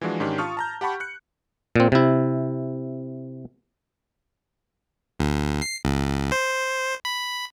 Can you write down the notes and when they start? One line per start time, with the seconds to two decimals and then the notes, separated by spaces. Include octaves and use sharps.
0.01 E3 F3 G#3 D4 F#4
0.20 G#2 D#3 C#4 D4 G4
0.38 F4 A5 C#6 D#6 F6
0.57 A5 A#5 G6
0.81 G4 F#5 A5 B5 C#6
1.00 F#6 C#7
1.76 A#2 C4
1.92 C3 E4
5.20 D2
5.62 C7
5.85 C#2
6.32 C5
7.05 B5